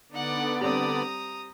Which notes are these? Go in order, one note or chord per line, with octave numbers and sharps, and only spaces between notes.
D3 B3 D#4 D5 F#5
G3 C4 A#5 D#6